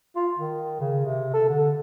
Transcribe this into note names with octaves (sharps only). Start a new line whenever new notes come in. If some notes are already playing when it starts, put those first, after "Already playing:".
F4
D#3
C#3
C3
A4
D3